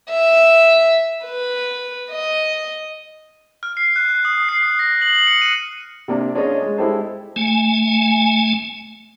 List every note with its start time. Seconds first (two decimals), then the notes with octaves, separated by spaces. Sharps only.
0.10 E5
1.24 B4
2.10 D#5
3.63 F6
3.77 C7
3.96 F#6
4.08 F#6
4.25 D#6
4.49 C7
4.62 D#6
4.79 A#6
5.02 F#7
5.15 F#7
5.27 C#7
5.42 D#7
6.08 C3 A#3 D4
6.35 C#4 D4 F4 G#4 C#5 D#5
6.62 G#3
6.77 G#3 E4 G4 A4 C5
7.36 A3 G#5